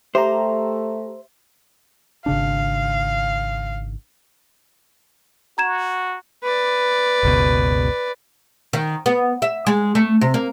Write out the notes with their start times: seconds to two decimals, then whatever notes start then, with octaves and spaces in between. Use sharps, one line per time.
0.15 A3 G4 C5 E5 A#5
2.26 G#1 C#3 D4 F5
5.58 F#4 A#5 G#6 E7
6.44 B4 D5
7.23 F#1 C#2 B2
8.73 D#3
9.06 B3
9.42 E5
9.66 G#3
9.95 A3
10.21 C3
10.34 A#3